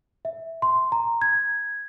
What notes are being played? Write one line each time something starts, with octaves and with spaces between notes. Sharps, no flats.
E5
C6
A#5
G#6